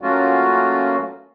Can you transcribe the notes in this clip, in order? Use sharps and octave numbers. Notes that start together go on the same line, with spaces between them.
F#3 A3 A#3 C#4 F4 F#4